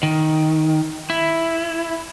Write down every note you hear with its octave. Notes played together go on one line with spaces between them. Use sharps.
D#3
E4